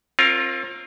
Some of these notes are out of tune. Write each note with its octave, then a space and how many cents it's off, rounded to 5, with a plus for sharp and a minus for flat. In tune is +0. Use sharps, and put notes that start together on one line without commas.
C4 +35 F4 +0 A#4 +0